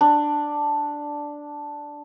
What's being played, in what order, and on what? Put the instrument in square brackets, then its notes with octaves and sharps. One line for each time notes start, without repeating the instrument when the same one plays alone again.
[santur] D4